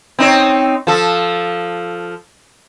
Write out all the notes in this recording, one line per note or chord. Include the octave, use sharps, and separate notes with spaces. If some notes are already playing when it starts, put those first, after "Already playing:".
C4 D#4 C#5
F3 A4